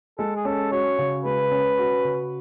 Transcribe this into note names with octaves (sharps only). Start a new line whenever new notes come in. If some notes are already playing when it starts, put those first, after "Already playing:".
G#3 A4
G#4
C#4 A4
F#4 C#5
C#3
G#3 B4
C#4
F#4
C#3